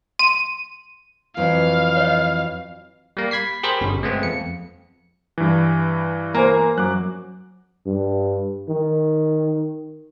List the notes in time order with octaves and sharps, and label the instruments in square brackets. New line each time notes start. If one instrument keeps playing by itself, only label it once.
[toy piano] C6 [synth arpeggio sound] D#7
[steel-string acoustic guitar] F2 E3 F#3 [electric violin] F5
[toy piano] C#5 D#5
[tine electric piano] G3 A#3
B5 G#6 B6 C7
G4 G#4 A#4 C5 B5
G1 B2 C#4
G#3 A3 B3 C4
F2 C#7
[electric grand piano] G2 E3
[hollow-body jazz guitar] A#3 [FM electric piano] C5 G#5 A#5
[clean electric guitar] F#2 [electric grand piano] D6 F#6
[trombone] G2
D#3